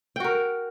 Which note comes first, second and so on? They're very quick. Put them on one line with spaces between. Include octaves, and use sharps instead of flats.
G5 F#4 A#4